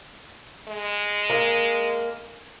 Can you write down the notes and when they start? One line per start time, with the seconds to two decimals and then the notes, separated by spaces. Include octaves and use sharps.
0.68 G#3
1.30 A#3